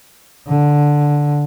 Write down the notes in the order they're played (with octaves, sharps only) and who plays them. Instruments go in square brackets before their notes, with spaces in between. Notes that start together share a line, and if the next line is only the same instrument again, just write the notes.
[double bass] D3